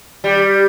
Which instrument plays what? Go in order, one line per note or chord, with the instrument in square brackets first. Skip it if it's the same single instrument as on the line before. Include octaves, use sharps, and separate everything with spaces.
[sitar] G3